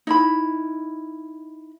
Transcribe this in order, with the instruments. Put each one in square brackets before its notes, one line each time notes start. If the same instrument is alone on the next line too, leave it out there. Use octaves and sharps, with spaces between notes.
[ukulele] D#4 E4 B5